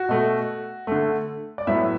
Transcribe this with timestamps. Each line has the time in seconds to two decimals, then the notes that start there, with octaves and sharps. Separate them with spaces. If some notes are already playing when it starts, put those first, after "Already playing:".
Already playing: F#4
0.09 B2 A3
0.87 D3 A3
1.58 D5
1.67 A2 F#3 B3 E5